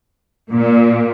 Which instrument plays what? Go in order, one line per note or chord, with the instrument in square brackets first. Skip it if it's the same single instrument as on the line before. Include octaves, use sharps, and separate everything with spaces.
[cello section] A#2